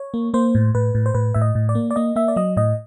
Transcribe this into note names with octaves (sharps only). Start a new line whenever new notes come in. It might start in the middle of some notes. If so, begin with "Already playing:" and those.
Already playing: C#5
A#3
A#3 C5
A2
A2 B4
A2
C5
A2 B4
A2 E5
D#5
A2
D5
A#3
D5
A#3 D#5
A#3 E5
D5
F#3 D#5
A2 D#5